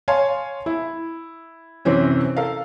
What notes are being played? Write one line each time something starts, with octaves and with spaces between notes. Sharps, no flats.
C#5 F5 G#5 A5 C6
E4
F#2 C3 E3 C4 C#4
A4 A#4 F5